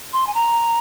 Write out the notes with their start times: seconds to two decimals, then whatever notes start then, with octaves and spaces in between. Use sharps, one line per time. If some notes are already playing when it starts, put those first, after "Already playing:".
0.13 C6
0.27 G#5
0.34 A#5